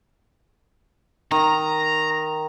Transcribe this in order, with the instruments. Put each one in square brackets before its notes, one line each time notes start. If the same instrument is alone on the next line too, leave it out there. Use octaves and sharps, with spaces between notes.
[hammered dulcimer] D#3 [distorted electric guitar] A#5